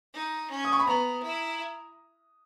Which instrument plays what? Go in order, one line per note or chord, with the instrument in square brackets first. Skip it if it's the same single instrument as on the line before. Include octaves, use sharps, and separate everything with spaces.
[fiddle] D#4
C#4
[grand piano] D#6
C#6
B5
[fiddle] B3 [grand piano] A#5
[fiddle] E4